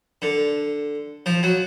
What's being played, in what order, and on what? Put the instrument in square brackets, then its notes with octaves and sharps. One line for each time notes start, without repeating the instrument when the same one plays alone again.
[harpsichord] D3
F3
F#3